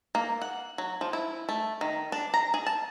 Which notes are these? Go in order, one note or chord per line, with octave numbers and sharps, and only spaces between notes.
A#3
F#5
F#3
F3
E4
A3
D#3
D4
A#5
G#4
A5